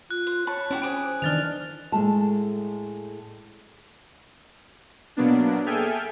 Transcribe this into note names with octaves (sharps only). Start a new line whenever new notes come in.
F4 F#6
C5
C#5 A5 B5 C#6
C#4 E4 F#4 G4
G#4 C5 D6 D#6
D#3 E3 D4 F6 A6 F7
A2 G#3 A3 A5
B2 F#3 A#3 B3 D4
G#4 A4 E5 G5 G#5 F6